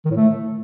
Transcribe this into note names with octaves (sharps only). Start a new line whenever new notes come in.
D#3
A2
A3